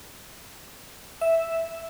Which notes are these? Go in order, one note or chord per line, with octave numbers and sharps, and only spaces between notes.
E5